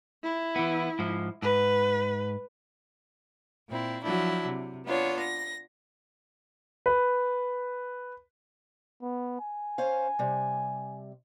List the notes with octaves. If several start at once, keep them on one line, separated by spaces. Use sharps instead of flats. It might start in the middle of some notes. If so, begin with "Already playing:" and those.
E4
E3 B3
G#2 F3
G#2 B4
A#2 C4 E4
F3 F#3 D4 E4
C3
B3 D4 F4 C#5
A#6
B4
B3
G#5
C#4 C5 F5
C3 G3